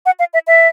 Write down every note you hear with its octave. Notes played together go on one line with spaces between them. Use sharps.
F#5
F5
E5
E5